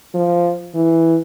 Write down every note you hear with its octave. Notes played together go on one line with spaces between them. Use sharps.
F3
E3